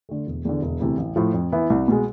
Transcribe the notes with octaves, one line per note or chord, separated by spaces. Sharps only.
D3 A3
E1
E2 D3
E1
D2 C3 E3
A1
A2 F3
F2
E3 B3 E4
C2
B2 G#3